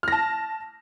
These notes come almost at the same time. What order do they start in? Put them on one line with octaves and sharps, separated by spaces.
F6 A#6 A5